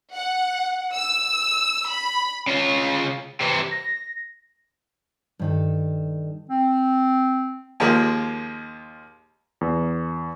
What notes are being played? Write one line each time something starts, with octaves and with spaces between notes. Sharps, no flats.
F#5
E6
B5
C#3 F4
C3 E3
A#6
G2 D#3 A4
C4
D#2 F3 G#3 A#3
E2